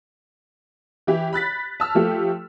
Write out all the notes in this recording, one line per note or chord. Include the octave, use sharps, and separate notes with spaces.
E3 E4 G4
B5 F#6 A6 B6
A5 E6 F6
F3 A3 G4 A4